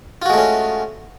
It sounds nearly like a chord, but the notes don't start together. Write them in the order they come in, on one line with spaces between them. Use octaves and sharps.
F4 F#4 G#3 A3 C#4